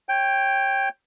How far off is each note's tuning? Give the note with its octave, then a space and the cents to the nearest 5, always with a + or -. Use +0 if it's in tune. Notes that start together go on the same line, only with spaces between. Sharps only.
C#5 -25 G5 +0